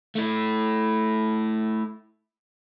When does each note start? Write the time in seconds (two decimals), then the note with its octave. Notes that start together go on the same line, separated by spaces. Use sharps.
0.15 A3 E4